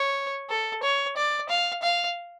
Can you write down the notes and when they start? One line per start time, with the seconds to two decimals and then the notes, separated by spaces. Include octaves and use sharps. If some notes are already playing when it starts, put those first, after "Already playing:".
Already playing: C#5
0.49 A4
0.83 C#5
1.17 D5
1.49 F5
1.83 F5